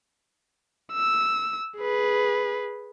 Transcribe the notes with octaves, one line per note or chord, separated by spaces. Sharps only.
E6
G#4 B4